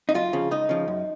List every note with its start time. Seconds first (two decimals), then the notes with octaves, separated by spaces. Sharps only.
0.09 D#4
0.14 F#2 F4
0.33 C#3 F3
0.51 C#2 D#4
0.69 C#3 F3
0.88 F#2